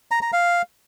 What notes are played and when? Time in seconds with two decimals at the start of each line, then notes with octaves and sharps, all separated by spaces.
0.11 A#5
0.22 A#5
0.33 F5